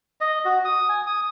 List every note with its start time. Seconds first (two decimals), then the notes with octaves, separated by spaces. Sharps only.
0.21 D#5
0.45 F#4
0.65 D#6
0.89 G#5
1.07 D#6